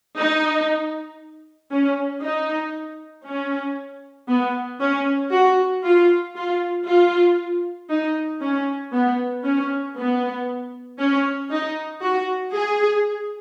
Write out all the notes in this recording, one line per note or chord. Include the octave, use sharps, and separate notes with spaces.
D#4
C#4
D#4
C#4
B3
C#4
F#4
F4
F4
F4
D#4
C#4
B3
C#4
B3
C#4
D#4
F#4
G#4